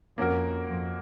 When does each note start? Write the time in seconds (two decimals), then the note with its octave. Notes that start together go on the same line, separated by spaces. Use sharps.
0.18 F2 A#3 C#4 F#4 A#4
0.68 F2